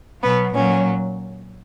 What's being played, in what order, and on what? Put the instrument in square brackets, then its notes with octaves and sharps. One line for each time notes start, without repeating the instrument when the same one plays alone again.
[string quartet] B2 F#3 B3
A#2 F#3 C#4